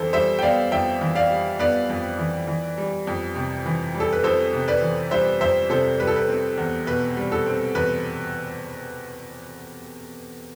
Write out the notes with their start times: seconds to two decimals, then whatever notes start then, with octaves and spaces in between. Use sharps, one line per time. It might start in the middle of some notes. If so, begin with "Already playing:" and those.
Already playing: F2 E3 A4 C5
0.13 G3 C5 E5
0.39 G5
0.42 B3 D5 F5
0.72 F2 E5 G5
1.01 E3
1.15 D5 F5
1.30 G3
1.59 B3 B4 D5
1.90 F2
2.18 E3
2.47 E3
2.78 G3
3.07 F2
3.36 C3
3.66 E3
3.95 G3
4.00 A4
4.13 B4
4.24 F2 A4 C5
4.53 C3
4.68 B4 D5
4.82 E3
5.11 G3 C5 E5
5.41 F2 C5 E5
5.70 C3 A4 C5
6.00 G3 B4
6.07 A4
6.16 B4
6.28 C4
6.57 E2
6.87 B2 B4
7.17 G3
7.32 A4
7.46 C4
7.75 E2 B4